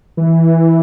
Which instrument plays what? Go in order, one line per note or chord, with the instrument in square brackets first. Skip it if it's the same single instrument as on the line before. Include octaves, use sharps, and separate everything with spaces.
[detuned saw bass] E3